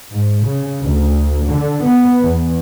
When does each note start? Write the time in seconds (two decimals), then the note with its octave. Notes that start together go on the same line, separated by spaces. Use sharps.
0.13 G#2
0.46 C#3
0.82 D2
1.47 D3
1.85 B3
2.24 E2